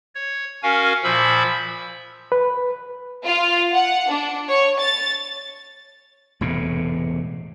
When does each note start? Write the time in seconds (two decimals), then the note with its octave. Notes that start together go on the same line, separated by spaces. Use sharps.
0.15 C#5
0.63 C#4 F#4 A#4 F5 G#5
1.04 A#2 F3 E5 B5 E6
2.32 B4
3.24 F4
3.75 F#5
4.09 D4
4.48 C#5
4.79 A6
6.41 E1 A2 C3